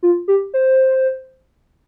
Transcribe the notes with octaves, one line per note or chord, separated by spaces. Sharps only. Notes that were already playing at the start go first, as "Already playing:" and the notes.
F4
G4
C5